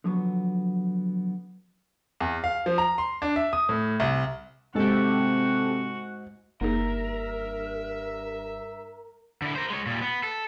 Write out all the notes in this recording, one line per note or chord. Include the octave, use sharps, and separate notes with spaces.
D3 F3 F#3 B3
E2
F5
F3
A#5
C6
D4
E5
D#6
A2
C2
G#2 C3 F#4 G4 A4
F#1 G2 A#3 D#4 G#4 A#4 E5
D3 E4
A#4 C5
G#3 C#5
A#2 G3
B3
A4